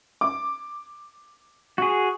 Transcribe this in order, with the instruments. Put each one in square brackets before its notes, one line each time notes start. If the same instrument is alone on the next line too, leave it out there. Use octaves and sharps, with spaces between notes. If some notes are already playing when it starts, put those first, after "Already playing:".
[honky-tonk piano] D6
[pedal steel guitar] F#4 G#4